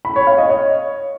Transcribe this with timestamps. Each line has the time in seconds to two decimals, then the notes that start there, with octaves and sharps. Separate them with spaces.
0.05 B5
0.16 C#5
0.27 F5
0.38 D#5
0.49 C#5